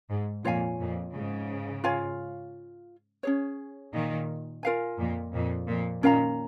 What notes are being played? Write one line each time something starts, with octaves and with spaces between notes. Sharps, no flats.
G#2
F2 A#2 F4 C#5 F5 G#5
F2 A#2
G#2 C#3
F4 C#5 F5 G#5
C#4 G#4 C#5
A#2 D#3
F4 A#4 F5 G#5
F2 A#2
F2 A#2
F2 A#2
A#2 D#3 C#4 A#4 F5 A#5